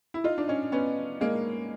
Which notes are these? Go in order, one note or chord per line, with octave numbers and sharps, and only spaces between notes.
E4
D#4 F4
D4
C#4 D#4
B3 C#4
G#3 A#3